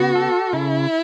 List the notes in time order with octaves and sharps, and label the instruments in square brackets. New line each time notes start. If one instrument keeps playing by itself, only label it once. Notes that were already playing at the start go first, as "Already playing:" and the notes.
Already playing: [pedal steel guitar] C#3 B3 [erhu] F#4
[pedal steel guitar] A4
[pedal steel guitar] C#3 [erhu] E4